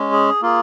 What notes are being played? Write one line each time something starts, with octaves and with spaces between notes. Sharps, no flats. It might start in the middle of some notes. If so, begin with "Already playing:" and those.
Already playing: G#3 C#4
G#4
A#3 F4 G#4